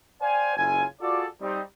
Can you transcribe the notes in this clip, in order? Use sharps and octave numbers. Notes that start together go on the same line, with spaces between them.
C5 D5 F5 G5 G#5
F#1 C#3 E4 F4 G#5
F4 F#4 G#4 A4 D5
G3 C4 D#4